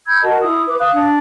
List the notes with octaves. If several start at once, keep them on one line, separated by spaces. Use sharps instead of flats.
B5 E6 G6 G#6
F#4 A#4 D#5 A5
E4 D#6
B4 D6
F5 D#6 F#6
D4